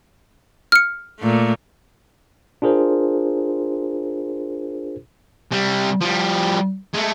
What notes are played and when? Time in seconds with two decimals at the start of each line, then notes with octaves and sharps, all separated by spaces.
0.72 F6 C#7
1.20 A#2 A3
2.62 D4 F4 G#4 A#4 C5
5.51 C3 G3
6.01 F3 G3
6.94 G#3 A3